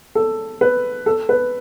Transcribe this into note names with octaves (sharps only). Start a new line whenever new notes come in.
A4
B4
A4
B4